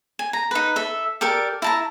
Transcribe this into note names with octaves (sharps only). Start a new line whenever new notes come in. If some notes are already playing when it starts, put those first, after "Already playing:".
G#5
A#5
D#4 B4
A4 E5
G4 A4 A#4 D5
E4 A5 A#5